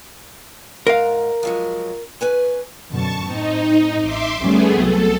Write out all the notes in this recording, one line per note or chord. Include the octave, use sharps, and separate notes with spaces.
G#2 A#4 F5
F3 F#3 G#3
C#4 B4 G#5
F#2 B2 D3 A5 C#6
A2 C4 D#4
A1 E5 C6 D6
D2 G3 A3 B3 C#4 G#4
C2 F#3 C4 A4